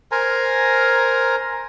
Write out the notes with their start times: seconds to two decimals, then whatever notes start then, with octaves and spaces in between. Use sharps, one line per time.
0.11 A#4 C5 G#5 A#5